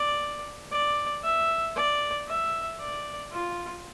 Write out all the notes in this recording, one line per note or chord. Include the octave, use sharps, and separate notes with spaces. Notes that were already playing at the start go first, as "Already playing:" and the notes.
Already playing: D5
D5
E5
D5
E5
D5
F4